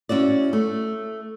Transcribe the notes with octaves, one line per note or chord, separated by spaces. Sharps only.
C#4 E4 F#4 D5
A3